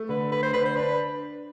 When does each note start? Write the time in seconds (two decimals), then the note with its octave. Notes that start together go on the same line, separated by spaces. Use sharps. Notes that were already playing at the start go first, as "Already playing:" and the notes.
Already playing: A3
0.09 D3 B4
0.31 A3 B4
0.43 C5
0.53 D3 B4
0.65 C5
0.76 D4 B4